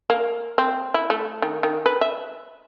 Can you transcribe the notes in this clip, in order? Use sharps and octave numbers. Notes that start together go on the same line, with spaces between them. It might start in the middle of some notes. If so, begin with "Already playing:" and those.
A#3
C4
E4
A3
D#3
D#3
B4
E5